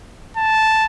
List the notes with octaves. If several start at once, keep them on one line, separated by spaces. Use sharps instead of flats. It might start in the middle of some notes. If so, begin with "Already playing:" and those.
A5